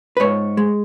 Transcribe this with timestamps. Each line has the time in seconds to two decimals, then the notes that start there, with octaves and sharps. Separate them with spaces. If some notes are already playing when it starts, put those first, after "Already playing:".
0.17 B4
0.20 G#2 C#5
0.57 G#3